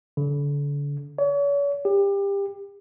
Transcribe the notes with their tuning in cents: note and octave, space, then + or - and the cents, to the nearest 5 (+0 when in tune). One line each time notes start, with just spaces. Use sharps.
D3 -35
C#5 +40
G4 +25